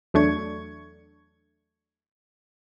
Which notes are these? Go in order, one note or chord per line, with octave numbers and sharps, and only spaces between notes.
E2 F#3 A3 D4 C#6 G#6